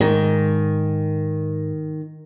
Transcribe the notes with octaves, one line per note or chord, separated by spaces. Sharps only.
G#2 D#3